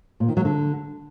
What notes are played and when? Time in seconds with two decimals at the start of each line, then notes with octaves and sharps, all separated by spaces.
0.20 A#2
0.28 D#3
0.37 F#3
0.45 D3